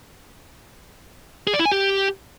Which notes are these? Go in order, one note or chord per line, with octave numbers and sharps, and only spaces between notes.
G#4
D5
E4
G#5
G4